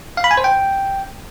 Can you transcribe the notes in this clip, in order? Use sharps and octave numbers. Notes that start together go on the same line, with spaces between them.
F5
B5
G#5
C5
G5